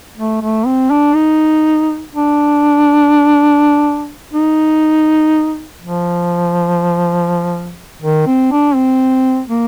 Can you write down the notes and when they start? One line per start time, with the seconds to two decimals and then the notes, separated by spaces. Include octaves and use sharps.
0.17 A3
0.42 A3
0.66 C4
0.91 D4
1.15 D#4
2.13 D4
4.34 D#4
5.82 F3
8.02 D#3
8.27 C4
8.52 D4
8.75 C4
9.49 A#3